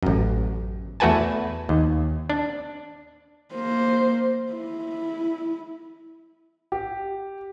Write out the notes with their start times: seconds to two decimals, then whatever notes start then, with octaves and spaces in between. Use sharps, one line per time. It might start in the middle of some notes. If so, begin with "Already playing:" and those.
0.03 A1 F#2
1.00 E2 A3 F#4 B4 G#5 A5
1.69 D#2
2.30 D4
3.54 A#3 C5
4.52 E4
6.72 G4